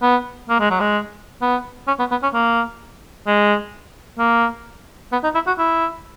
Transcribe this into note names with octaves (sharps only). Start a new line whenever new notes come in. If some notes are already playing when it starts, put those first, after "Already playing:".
B3
A#3
G#3
F#3
G#3
B3
C#4
B3
B3
C#4
A#3
G#3
A#3
B3
D#4
E4
F#4
E4